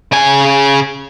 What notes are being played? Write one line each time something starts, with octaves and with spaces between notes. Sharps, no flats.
C#3 G#5